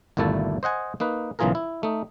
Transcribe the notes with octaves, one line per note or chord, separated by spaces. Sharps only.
G1 D#2 A#2 A3 E4 A5
C5 D#5 F#5 G#5
A#3 D#4 B4
B1 C#3 E3 F4 G#4 A#4
E4
A3 D#4